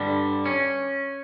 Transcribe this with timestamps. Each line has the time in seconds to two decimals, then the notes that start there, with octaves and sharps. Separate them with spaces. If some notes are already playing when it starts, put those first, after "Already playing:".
Already playing: G2 D3 G3
0.46 C#4